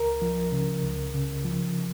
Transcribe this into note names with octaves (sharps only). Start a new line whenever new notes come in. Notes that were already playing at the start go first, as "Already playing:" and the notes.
Already playing: C#2 A#4
F3
C#3
C#2
C#3
F3